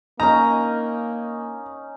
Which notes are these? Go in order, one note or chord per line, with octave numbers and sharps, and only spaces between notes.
A#3 C#4 D#4 A#5